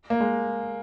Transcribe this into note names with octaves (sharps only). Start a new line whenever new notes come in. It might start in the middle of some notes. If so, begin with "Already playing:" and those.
A#3
G#3